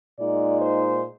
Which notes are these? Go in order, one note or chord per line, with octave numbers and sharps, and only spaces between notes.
A#2 G#3 D#4 D5
C5